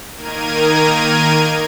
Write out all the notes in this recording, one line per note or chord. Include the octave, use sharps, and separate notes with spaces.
D#3 A#3 A#4 G#6 D#7